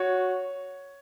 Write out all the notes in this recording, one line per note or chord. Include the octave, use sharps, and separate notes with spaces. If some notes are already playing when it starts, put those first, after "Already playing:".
Already playing: F#4 C#5